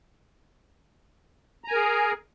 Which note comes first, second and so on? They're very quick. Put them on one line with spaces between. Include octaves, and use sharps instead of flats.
A#5 G#5 A#4 G#4